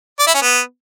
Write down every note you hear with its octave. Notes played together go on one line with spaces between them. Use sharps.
D5
E4
C#4
B3